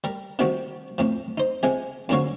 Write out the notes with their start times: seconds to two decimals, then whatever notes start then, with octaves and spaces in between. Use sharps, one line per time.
0.04 G3 A#4
0.39 C3 D#3 F3 G3 F#4 G5
0.98 F2 A2 F3
1.38 D#4 C5
1.63 C3 F3 G#3 G#5
2.09 F2 G#2 D3 F#3 C#5 F5